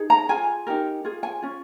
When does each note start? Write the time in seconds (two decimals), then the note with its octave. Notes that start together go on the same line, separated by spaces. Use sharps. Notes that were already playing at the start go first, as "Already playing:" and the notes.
Already playing: D#4 G#4
0.10 A#5
0.29 F4 G#4 G#5
0.67 D#4 G4 A#4
1.04 F4 G#4
1.23 G#5
1.42 C#4 F4